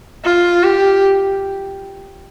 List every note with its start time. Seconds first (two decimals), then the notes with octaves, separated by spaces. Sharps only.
0.24 F4
0.63 G4